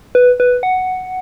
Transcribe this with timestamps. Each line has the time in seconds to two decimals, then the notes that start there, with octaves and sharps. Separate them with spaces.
0.15 B4
0.40 B4
0.63 F#5